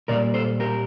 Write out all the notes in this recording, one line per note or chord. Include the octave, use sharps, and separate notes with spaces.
A#2 G3 A#3 A#4 D5
A4 C5
G4 A#4